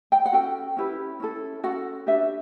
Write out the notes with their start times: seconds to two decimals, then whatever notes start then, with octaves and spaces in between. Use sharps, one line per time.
0.12 G5
0.26 F#5
0.32 C#4 F#4 A4 G5
0.77 C#4 E4 G4 B4
1.20 C#4 E4 A4
1.64 C#4 F#4 A4 F#5
2.07 D4 G4 B4 E5